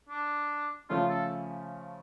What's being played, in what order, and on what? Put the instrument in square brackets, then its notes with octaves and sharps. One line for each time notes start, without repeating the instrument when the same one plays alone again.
[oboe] D4
[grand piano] C#3 F3 A3 C#4 [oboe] F4
[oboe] A4